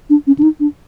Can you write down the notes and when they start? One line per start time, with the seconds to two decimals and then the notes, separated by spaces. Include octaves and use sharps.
0.10 D4
0.27 C#4
0.39 D4
0.43 D#4
0.60 D4